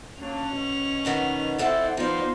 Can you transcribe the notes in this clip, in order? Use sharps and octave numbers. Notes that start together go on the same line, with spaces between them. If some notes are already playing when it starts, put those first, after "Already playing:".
F#3 A#3 C#4 D4 F7
B2
D#3 B3 D4
F2 C4 E4 A4 D5 F#5
F3 B3 D#4 F4 C5 D5